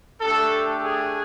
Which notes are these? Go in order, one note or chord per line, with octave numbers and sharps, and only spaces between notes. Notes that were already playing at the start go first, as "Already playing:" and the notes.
A3 D4 G4 A4
G#4